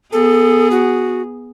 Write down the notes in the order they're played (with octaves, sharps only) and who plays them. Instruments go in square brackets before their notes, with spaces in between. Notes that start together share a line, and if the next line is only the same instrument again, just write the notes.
[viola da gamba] B3 G#4 [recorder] A4
[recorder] F#4